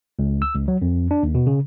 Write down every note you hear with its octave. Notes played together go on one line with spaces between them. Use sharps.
C#2
E6
C#2
F#3
F2
D4
D#2
B2
C#3